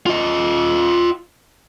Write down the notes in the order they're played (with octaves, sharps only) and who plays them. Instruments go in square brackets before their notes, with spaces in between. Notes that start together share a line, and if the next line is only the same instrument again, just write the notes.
[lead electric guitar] F4 D#5